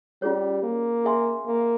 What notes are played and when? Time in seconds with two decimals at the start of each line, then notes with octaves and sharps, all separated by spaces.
0.22 G3 C#4 F4 G#4 C#5
0.63 A#3
1.05 G#4 E5 G#5 C6
1.45 A#3